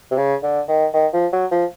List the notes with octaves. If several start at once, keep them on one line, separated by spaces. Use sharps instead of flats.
C3
C#3
D3
D#3
D#3
F3
F#3
F3